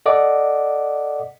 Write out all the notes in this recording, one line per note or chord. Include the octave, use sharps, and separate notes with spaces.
A4 D5 D#5 F#5 D6